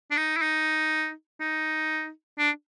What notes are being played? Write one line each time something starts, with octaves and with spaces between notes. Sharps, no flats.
D4
D#4
E4
D#4
D#4
D4